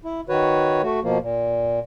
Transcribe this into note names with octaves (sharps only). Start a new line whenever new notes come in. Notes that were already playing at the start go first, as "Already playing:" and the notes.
E4
D#3 F#4 B4 C#5
A3 F#4
B2 F3 A#3
A#2